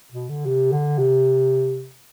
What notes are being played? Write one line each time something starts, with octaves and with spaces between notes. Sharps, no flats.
B2
D3
C3
D3
C3